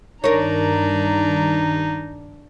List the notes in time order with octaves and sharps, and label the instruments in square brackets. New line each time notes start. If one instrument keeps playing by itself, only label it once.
[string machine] G2 D#3 [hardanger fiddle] D4 A#5 [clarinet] D#4 [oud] A#4 C#5